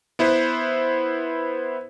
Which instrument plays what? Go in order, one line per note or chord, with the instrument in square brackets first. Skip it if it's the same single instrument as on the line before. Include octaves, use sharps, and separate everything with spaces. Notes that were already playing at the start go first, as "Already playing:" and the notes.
[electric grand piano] B3 E4 B4 C5